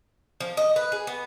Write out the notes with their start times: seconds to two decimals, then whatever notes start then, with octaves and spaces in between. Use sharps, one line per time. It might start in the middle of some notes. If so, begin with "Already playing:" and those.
0.40 F3
0.57 D#5
0.76 B4
0.92 G#4
1.07 B3